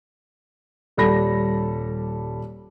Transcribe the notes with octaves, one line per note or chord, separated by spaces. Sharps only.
D#1 G3 A4 B5 A#6